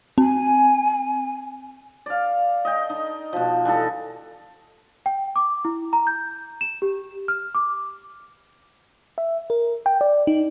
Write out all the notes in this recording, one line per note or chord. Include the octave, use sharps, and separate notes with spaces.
C4 G#5
D5 F5
D#5 G5
D#4
B2 F3
E3 G3 D#4 A4
G5
D6
E4
A#5
G6
E7
G4
F6
D6
E5
A#4
G5
D5
D#4